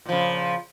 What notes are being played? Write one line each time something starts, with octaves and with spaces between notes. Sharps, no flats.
A#2 C#3 F3